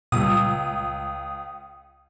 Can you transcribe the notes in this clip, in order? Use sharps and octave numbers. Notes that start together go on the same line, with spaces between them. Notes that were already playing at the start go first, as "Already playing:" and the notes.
C#2 A#2 G3 D#6